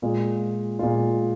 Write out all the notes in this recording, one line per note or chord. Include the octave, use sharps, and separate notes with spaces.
A#2 G#3 F4
A#2 G#3 F4